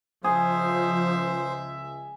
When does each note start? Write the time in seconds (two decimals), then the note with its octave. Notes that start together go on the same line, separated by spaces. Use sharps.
0.24 C#2 F3 G#3 G#4 C5 E5